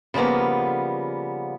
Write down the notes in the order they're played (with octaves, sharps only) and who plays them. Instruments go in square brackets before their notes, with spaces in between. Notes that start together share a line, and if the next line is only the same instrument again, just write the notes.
[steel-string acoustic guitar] C#3 F3 G3 A#3 B3